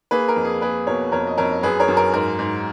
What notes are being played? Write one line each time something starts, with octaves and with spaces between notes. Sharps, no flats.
A#3 G#4 B4
A#4
F2
G#4
A#3 G#4 B4
B2 A#4 C#5
F2 A#4 C#5
D#5
F2 A#4 C#5
F#2 G#4 B4
A#4 C#5
F#2
A#4
G#2 A#4
G#2